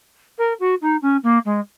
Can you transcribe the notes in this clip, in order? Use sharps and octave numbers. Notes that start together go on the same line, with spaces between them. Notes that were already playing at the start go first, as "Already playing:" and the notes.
A#4
F#4
D#4
C#4
A#3
G#3